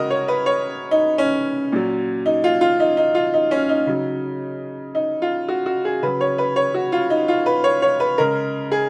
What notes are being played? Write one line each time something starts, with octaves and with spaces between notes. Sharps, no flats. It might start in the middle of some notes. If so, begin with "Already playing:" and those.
Already playing: C#3 G#3 F#4 A#4 D#5
C#5
B4
C#5
D#4
C#4
A#2 F#3
D#4
F4
F4
D#4
D#4
F4
D#4
C#4
D#4
C#3 F#3
D#4
F4
F#4
F#4
G#4
C#3 F#3 B4
C#5
B4
C#5
F#4
F4
D#4
F4
B4
C#5
C#5
B4
C#3 G#3 A#4
G#4